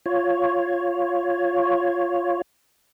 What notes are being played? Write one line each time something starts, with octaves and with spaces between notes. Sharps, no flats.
F4 C#5